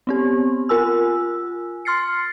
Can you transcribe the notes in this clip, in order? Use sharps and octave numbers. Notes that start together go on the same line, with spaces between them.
B3 C4 G4
F4 A#4 G#5 E6
C6 F6 A6 C7 C#7